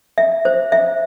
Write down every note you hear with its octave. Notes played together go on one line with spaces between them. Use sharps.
E5
C5
E5